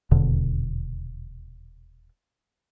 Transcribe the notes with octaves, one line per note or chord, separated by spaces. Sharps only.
D#1 E2 B2 D3